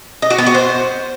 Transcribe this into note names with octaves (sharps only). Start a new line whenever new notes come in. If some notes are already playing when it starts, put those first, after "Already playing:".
D#5
F#4
B3
F#4
C5